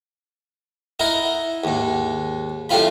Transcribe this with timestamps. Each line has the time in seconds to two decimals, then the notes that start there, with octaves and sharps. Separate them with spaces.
0.99 D#4 E4 A#4 F#5
1.64 D#2 G#2
2.69 C2 F#2 A3 C4 F4 B5